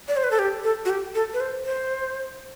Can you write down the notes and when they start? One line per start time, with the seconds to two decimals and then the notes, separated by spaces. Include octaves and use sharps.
0.08 D5
0.17 C5
0.24 B4
0.31 A4
0.39 G4
0.64 A4
0.85 F#4
0.90 G4
1.15 A4
1.34 B4
1.40 C5
1.66 C5